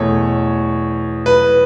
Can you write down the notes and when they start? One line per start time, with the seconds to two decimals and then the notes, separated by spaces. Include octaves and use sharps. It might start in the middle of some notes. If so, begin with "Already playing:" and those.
Already playing: E2 B2 A3 C#5
1.26 B4